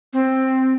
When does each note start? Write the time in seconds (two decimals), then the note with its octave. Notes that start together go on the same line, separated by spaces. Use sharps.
0.13 C4